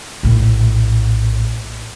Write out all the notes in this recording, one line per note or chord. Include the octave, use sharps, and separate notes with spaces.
A#1 A2